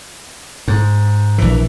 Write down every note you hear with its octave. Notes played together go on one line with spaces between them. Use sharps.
G#2
A#1 E3